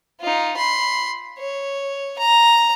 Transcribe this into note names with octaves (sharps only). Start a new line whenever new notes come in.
D#4 F4
B5 C6
C#5
A#5